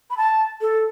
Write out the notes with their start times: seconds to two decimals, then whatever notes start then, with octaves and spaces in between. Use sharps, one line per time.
0.10 B5
0.17 A5
0.61 A4